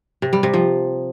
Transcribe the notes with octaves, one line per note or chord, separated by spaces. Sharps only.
C3
G3
C3
F3